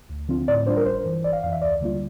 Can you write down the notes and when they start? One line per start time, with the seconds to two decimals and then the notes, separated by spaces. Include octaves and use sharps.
0.09 D2
0.28 D3 F3 C4 F4
0.48 A2 D5
0.66 G3 D4 F4 C5
0.77 A#4
0.85 G1 C5
1.05 G2 E3
1.24 G1 D5
1.33 F5
1.43 F2 F5
1.46 E3
1.53 E5
1.61 D2 D5
1.81 D3 G3 A#3 F4